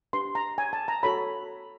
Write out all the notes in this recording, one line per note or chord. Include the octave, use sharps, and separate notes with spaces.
D4 G4 B4 C6
A#5
G#5
A5
A#5
F#4 A4 C#5 B5